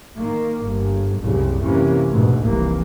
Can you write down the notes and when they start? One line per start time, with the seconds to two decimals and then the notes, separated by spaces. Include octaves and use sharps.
0.16 D#3 A#3
0.65 G1
1.20 F#1 C2 F#2 C#3
1.62 C3 E3 A#3 C#4
2.09 D2 G#2 B2
2.41 F1 C2 E3 A#3